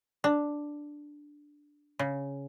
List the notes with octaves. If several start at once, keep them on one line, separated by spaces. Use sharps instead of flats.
D4
C#3